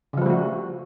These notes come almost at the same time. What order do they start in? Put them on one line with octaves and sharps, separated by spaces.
C#3 F3 G3 A3 F#4